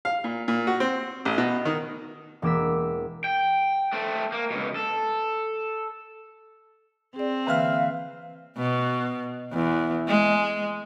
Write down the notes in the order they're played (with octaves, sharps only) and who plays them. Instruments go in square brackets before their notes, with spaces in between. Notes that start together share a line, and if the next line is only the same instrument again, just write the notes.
[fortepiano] F5
A#2
A#2
F#4
C4
A1
B2
D#3
[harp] E1 A#3 D6 E6 B6
[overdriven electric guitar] G5
A3 C4
A#3
C#2 B2
A4
[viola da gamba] C4 [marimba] G#4 D5
[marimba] D3 E3 A#3 [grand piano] B4 E5 F6 [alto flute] F5
[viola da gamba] B2
E2
G#3